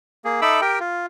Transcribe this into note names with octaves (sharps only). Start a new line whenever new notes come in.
A#3 G#4
D#4 A4 E5 B5 D6 E6
G4 A#4 G5
F4